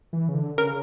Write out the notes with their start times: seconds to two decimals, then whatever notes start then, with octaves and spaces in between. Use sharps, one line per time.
0.13 E3
0.29 C#3
0.34 D3
0.57 C#3 A#4